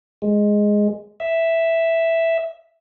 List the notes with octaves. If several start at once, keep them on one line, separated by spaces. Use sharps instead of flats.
G#3
E5